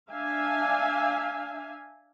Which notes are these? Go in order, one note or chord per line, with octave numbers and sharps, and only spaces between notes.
D4 E5 F5 G#5